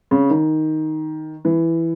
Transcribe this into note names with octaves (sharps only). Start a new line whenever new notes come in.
C#3
D#3
E3